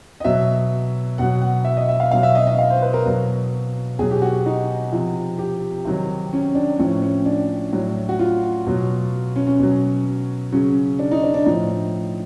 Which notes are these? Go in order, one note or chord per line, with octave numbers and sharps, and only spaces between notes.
D#5
B2 F#3 E5
B2 F#3 F#5
F#5
E5
D#5
E5
F5
B2 F#3 F5
E5
D#5
D#5
F5
C5
B4
A#4
B2 F#3
B2 F#3 G#4
G4
F#4
D#4
C3 F3
G4
C3 D#3 F#3
C#4
D4
A2 F3 C#4
C#4
D4
A2 F#3
F#4
F4
B2 F#3
C#4
C#4
B2 F#3
C#3 F#3 C#4
D4
D#4
D4
D4
A2 F3 D#4